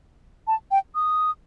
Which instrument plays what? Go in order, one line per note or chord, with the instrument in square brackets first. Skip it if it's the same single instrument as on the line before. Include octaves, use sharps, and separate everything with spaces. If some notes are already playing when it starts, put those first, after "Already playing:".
[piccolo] A5
G5
D#6